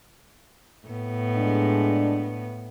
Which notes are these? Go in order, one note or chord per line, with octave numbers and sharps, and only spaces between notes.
A2 B3
G#3 D4